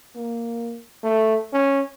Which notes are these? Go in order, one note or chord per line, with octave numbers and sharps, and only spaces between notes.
A#3
A3
C#4